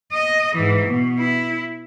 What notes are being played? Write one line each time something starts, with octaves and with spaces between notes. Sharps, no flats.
D#5
G#2 E3
B2
E4